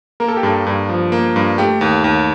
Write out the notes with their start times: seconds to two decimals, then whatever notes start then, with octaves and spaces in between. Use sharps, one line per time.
0.20 A#3 A#4
0.28 A4
0.37 G4
0.43 G2 A4
0.67 G2
0.89 F3
1.12 A#3
1.36 G2
1.58 A3 G4
1.81 D#2
2.04 D#2